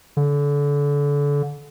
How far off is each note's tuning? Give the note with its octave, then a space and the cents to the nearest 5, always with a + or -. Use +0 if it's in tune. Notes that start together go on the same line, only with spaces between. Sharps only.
D3 -30